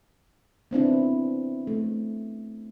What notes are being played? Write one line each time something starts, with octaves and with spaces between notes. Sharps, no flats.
B3 C4 D4 E4
A3